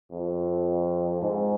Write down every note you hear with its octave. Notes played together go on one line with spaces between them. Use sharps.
F2
G#2